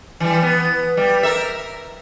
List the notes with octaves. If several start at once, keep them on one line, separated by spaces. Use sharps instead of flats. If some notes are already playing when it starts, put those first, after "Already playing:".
E3 G3
B3
G3
A#4 E5